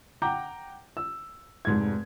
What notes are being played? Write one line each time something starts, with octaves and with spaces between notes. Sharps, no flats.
F#5 G5 A#5 D6 G6
E6
F1 G#2 G#6